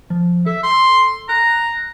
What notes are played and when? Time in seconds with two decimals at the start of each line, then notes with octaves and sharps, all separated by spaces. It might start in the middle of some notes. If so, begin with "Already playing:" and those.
0.10 F3
0.46 A4 E5
0.63 C6
1.29 A#5 F#6